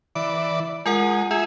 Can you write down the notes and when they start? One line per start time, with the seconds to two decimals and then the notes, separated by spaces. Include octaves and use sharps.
0.16 E3 D5 D7
0.86 G#3 F4 A#4 F#5
1.31 F4 G#4 E5